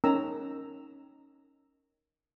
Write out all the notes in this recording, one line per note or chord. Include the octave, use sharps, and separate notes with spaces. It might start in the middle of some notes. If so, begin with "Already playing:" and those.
C#4 D#4 A#4 A#5 E6